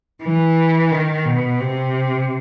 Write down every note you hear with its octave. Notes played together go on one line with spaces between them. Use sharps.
E3
D#3
B2
C3